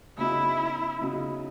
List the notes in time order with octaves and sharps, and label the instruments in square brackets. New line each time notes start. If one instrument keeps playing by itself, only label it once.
[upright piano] F#2 C#3 F#3 B3 D#4 [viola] E4
[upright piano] C#3 F#3 B3 D#4